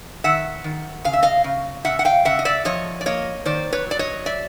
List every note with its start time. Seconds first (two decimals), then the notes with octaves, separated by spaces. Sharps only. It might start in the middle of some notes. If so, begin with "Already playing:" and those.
0.24 D#3 E5 F#5
0.64 D#3
1.04 C#3 F5
1.13 E5
1.23 D#5 F5
1.44 C#3
1.85 C#3 E5 F#5
1.99 F#5
2.05 F5 G5
2.25 C#3 E5 F#5
2.39 D#5
2.45 D5 E5
2.65 F3 C#5 D#5
3.01 D5
3.06 A#3 C#5 D#5
3.45 D#3 C5 D5
3.73 B4 C#5
3.87 F#3 D5
3.99 C#5 D#5
4.26 D5 E5